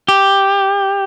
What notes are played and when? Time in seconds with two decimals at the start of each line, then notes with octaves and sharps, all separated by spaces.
0.08 G4